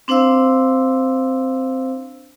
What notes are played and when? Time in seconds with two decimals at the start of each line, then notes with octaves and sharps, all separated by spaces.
0.08 C4 D4 C5 F5 E6